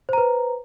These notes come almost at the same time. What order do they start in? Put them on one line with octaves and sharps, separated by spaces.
C5 A#5 B4